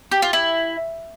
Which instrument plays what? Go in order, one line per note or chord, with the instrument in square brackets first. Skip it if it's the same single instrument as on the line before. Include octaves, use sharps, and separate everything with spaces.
[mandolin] G4
F4
E4